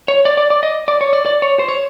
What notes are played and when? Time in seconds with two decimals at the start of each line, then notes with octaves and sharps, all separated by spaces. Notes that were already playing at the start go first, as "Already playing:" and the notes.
0.08 C#5
0.25 D5
0.37 D5
0.50 D5
0.63 D#5
0.88 D5
1.01 C#5
1.13 D5
1.26 D5
1.42 C#5
1.59 C5
1.69 C#5